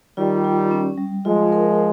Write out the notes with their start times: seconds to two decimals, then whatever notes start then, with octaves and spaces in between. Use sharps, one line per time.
0.17 D#3 G3 F4
0.44 F4
0.71 C#4
0.98 G3
1.25 F3 G#3 F4
1.52 A#4